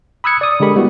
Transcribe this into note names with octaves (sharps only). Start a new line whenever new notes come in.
B5 D#6 E6 F#6 G#6 C#7
D5 D#6
D3 G#3 G4 A#4 B5
G3 B3 E4 F#4